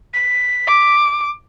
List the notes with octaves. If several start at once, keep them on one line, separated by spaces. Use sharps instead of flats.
B6
D6